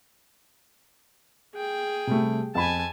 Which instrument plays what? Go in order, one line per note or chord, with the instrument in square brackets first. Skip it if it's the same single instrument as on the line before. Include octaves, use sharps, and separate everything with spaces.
[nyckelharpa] G#4 G5
[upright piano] C3 G3 A3
[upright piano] F2 B5 [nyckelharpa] G#5 A5